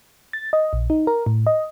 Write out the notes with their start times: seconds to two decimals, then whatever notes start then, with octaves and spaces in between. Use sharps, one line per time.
0.33 A6
0.53 D#5
0.73 A#1
0.90 D#4
1.07 A#4
1.26 A2
1.47 D#5